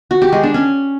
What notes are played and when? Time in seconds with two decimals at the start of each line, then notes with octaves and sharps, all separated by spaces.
0.11 F#4
0.22 G4
0.33 G#3
0.43 D4
0.54 C#4